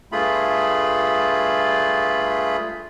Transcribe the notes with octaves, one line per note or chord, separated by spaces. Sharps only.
G2 A3 F4 G#4 B5